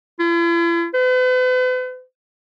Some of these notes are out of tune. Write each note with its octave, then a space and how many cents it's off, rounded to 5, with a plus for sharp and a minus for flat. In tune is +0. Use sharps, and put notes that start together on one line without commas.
E4 +45
B4 +45